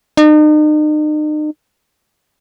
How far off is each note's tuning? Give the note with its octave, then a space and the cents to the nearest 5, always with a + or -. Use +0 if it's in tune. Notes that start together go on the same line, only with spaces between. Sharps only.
D#4 -40